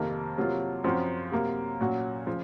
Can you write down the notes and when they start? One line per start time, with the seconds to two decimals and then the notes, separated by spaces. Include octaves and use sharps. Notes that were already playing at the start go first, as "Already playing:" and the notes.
Already playing: F2 C3 D#3 A#3
0.38 C3 F#3 A#3 F4
0.84 F#2 F3 C4 F#4
1.32 C3 F#3 A#3
1.80 A#2 F#3 C#4 F#4
2.27 C#3 F3